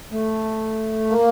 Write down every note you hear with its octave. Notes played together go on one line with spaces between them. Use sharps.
A3
A#3